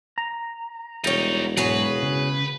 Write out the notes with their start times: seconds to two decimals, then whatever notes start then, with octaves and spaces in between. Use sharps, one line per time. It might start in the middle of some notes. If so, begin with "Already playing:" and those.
0.18 A#5
1.04 E1 B1 G3 D#4 C#5
1.57 G#2 B2 F#3 F#4 G#4 B4 C#5
2.02 C#3